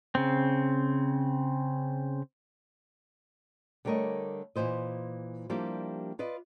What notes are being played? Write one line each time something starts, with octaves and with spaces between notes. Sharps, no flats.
C#3 C4
D3 G3 A3 A#4 C#5 D#5
A#2 C#3 E3 C5 D#5
F3 G3 A#3 D4 E4 G4
F4 B4 D5 D#5